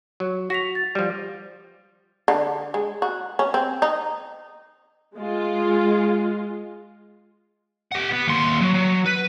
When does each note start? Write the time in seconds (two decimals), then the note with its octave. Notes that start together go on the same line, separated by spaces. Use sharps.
0.20 F#3
0.50 F#4 A#6 B6 F7
0.75 A6
0.95 F3 G3
2.28 D3
2.74 G#3
3.02 F#4
3.39 C#4
3.54 C4
3.82 D#4
5.16 G#3 F4
7.92 G4 F#5
8.11 B3
8.27 D#2 C6
8.61 F#3
8.74 F#3
9.06 B4